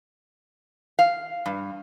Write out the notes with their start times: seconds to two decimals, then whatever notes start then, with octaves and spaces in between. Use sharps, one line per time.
0.99 F5
1.46 G2